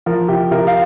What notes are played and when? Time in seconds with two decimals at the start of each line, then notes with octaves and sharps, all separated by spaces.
0.06 F3 A#4
0.28 C3 G4
0.51 C3 A#4
0.67 F5